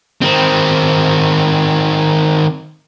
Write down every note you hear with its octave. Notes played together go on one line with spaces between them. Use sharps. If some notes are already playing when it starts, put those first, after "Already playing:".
D#3 C4